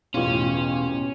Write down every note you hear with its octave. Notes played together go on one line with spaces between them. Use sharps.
A1 E2 B2 C#4 F4